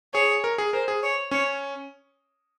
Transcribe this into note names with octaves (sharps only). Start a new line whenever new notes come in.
G#4 C#5
A#4
G#4
A#4 C5
G#4
C#5
C#4 C#5